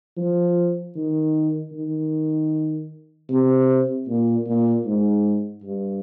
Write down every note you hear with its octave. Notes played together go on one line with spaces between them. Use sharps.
F3
D#3
D#3
C3
A#2
A#2
G#2
G2